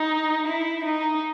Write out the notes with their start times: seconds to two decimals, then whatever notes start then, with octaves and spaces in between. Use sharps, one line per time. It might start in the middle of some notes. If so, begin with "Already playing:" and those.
Already playing: D#4
0.47 E4
0.85 D#4